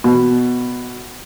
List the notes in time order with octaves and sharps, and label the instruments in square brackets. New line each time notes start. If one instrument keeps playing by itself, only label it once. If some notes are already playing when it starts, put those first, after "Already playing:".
[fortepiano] B2